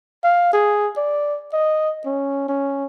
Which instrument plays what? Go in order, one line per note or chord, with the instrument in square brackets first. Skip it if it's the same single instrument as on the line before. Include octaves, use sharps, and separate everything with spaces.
[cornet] F5
G#4
D5
D#5
C#4
C#4